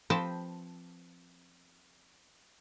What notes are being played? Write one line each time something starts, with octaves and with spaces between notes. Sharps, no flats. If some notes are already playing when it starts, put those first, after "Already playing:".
F3 C4 B4 C5 G5 A5